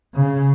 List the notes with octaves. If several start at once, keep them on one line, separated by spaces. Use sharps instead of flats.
C#3